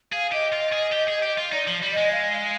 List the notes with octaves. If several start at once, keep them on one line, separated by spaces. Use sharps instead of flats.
G#4 F5
G4 D#5
F4
G#4
G4
G#4
G4
F4
D#4 D5
F3
G3
G#3 D#5
F5